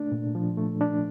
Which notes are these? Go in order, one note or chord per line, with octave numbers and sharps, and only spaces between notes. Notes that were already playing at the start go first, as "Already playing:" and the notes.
Already playing: A3 D4
A#2
F3
A3
D4